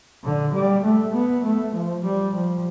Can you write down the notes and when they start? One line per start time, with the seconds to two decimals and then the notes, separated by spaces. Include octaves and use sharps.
0.24 D3
0.53 G3
0.83 A3
1.13 B3
1.43 A3
1.74 F3
2.04 G3
2.34 F3